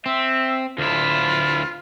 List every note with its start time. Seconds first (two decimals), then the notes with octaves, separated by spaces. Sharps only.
0.06 C4 E5
0.78 D2 E4 F4